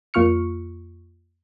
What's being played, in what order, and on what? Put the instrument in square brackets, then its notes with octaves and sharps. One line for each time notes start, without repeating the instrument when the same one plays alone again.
[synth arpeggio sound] F2 A#3 F4 C#6 F6 C#7